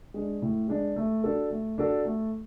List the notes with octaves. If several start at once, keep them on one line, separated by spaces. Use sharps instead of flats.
G#3 D4
A2
G#3 D4
A3
D4 F#4 A4
A3
D4 F#4 A4
A3